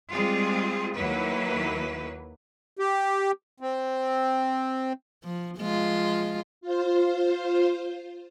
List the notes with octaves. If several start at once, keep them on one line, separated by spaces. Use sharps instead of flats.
G3 G#3 C4 F4 G#4
D#2 F#3 A#3 E4 B4
G4
C4
F3
F3 G#3 F4
F4 C5